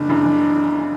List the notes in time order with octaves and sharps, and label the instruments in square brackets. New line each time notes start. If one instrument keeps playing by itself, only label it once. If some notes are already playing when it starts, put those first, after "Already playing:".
Already playing: [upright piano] F#1 [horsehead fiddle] D4
[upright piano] F#2 C#3 E3
F#1